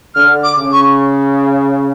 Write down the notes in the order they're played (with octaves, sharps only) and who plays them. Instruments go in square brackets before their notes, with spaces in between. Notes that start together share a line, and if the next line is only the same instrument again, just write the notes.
[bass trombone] D3 [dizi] F6
[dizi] D6
[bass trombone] C#3
[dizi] C#6